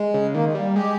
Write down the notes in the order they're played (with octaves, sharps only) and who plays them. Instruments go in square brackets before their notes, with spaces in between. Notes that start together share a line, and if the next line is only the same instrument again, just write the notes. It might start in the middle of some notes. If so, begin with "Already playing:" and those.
Already playing: [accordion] G#3
[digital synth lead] C#3
[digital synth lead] D#3 [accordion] A#3
[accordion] G#3
[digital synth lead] G3 [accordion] A#3
[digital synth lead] G#3 [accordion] G4